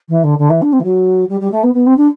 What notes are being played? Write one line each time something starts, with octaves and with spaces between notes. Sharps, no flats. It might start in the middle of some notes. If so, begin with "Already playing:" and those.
E3
D3
D3
E3
D4
C4
E3
F#3
G3
G3
A3
B3
B3
C4
D4